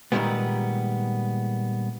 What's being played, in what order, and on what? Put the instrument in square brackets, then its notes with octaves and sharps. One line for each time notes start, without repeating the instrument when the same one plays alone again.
[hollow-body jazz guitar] A#2 D#3 F3 G3 G#3 B3